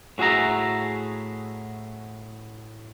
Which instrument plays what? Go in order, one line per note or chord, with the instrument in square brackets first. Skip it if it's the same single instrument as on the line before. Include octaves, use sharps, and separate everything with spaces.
[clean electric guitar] A2 F#4 G#4 E5 A#5